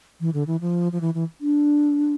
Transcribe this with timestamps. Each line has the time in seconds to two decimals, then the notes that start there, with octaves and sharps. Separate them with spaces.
0.20 E3
0.34 D3
0.47 E3
0.61 F3
0.92 F3
1.01 E3
1.14 E3
1.41 D4